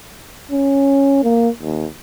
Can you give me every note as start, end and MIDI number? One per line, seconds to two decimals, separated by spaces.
0.51 1.20 61
1.24 1.49 58
1.62 1.86 39